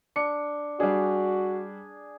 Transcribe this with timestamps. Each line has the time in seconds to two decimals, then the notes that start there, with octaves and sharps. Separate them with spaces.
0.16 D4 C#7
0.80 G3 D4 F#4 G#4